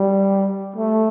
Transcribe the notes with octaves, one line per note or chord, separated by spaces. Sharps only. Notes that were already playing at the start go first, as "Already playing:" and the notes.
Already playing: G3
A3